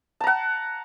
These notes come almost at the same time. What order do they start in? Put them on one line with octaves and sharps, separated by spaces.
A5 A#5 F#5